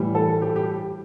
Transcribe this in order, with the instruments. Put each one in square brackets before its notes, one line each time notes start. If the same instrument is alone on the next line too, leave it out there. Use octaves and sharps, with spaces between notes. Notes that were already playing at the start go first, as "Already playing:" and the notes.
Already playing: [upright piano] A2 E3 G3
A4
G4
G4